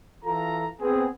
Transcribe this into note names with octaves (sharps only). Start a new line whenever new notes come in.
E3 F4 A4 A#5
B3 C4 G#4